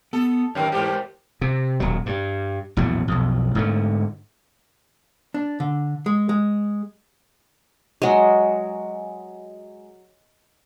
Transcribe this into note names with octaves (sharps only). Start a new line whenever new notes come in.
B3 A4
F#2 D#3 A#4 C#5 G5
G#2 E3 G4 A#4 C5 G5
C3
D#1 F#3
G2
A#1 E2 A2 F#3
B1 F2
G#2 D3 A3
D4
D3
G#3
G#3
F#3 G#3